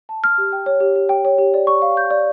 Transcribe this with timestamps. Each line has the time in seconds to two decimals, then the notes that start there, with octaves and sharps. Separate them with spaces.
0.09 A5
0.24 F6
0.38 G4
0.53 G5
0.66 C#5
0.80 G4
0.96 G4
1.09 G5
1.25 C#5
1.38 G4
1.54 D5
1.67 C#6
1.82 F5
1.97 G6
2.10 D5